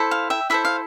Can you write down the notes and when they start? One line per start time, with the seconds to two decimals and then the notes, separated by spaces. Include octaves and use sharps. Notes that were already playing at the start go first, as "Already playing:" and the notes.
Already playing: E4 A4 C5
0.11 F5
0.30 E5 G5
0.50 E4 A4 C5 E5
0.65 F5